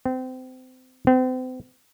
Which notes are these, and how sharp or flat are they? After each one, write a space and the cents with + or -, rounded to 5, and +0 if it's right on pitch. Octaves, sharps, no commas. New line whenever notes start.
C4 -30
C4 -40